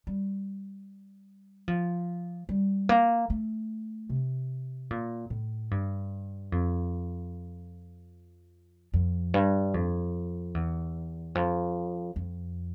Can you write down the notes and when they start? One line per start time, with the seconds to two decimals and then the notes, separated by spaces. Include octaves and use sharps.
0.07 G3
1.68 F3
2.49 G3
2.89 A#3
3.30 A3
4.10 C3
4.91 A#2
5.30 A2
5.71 G2
6.52 F2
8.94 F2
9.34 G2
9.74 F2
10.55 E2
11.35 F2
12.16 F2